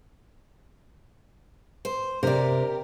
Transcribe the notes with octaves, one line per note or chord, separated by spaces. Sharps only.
C5
C3 G4 A#4 D5